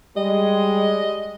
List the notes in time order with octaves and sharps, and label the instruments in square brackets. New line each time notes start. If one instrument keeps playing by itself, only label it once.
[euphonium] G3 [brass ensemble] G#3 [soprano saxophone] D#5